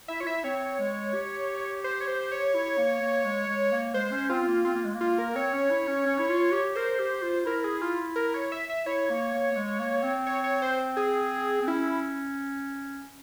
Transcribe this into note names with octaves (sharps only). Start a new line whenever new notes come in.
E4 E5
F4 C#5
E4 E5
C4 C#5
G#3
G4
C5
C#5
C5
C#5
E4
A#3
A#3
G#3
G#3
A#3
G#3 C5
C#4
C4 F4
C4
A#3
C4 F4
A#3
G#3
A#3
F4
A#4
C4 C#5
C#4
E4
C#4
C#4
E4
F4
G4
A#4 C5
G4
F4
E4 A#4
G#4
F4
A#4
C#5
E5
E5
E4 C#5
A#3
A#3
A#3
G#3
A#3
C4
C#5
C#5
C5
G#4
C4
C#4 E4